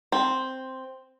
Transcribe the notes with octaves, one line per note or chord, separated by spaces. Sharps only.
C4